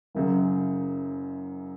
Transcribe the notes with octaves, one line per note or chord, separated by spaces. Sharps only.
F#1 F#2 C#3